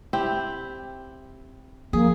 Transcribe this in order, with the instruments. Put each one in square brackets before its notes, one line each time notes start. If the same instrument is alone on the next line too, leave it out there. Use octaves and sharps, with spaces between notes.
[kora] C4 E4 G4
[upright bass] F3 G3 [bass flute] A#3 [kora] G#4